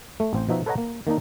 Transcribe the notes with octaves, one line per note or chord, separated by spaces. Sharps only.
A3
A1 C4 C5
B2 F3 D#4 F#4 E5
A4 B4 C#5 D#5 F#5 A#5
A#3
D#3 A#3 D4 D#4